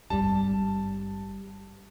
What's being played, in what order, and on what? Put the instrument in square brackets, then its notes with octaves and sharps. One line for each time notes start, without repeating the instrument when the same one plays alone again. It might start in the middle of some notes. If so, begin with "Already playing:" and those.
[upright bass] G#1 G2 [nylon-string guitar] G3 [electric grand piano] A5